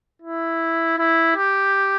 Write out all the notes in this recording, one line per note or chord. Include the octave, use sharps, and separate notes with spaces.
E4
E4
G4